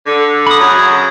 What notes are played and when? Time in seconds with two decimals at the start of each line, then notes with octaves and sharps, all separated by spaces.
0.06 D3
0.47 B5 D#6
0.60 F#2 C#3 F#3